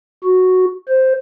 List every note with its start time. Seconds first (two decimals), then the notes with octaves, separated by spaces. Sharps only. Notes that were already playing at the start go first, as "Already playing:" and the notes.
0.24 F#4
0.88 C5